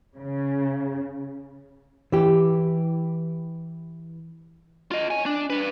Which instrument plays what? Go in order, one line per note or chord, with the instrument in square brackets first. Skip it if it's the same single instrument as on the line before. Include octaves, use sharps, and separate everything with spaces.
[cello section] C#3
[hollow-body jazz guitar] E3 G4
[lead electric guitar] F4 D#5
C#5 G#5
D4
D4 B4